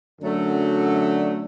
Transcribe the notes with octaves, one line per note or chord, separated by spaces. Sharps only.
F#2 D3 F#3 A3 D4